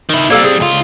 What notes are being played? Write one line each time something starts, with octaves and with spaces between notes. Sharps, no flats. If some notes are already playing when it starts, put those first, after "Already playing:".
D#3 E4
G3 A#3 C4 A4 F5
G#4
C#2 F4